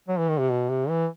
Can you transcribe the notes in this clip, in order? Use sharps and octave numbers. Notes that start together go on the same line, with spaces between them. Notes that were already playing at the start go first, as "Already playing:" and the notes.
F#3
E3
D#3
C3
B2
C3
E3